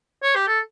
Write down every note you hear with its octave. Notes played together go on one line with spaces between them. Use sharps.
C#5
G4
A4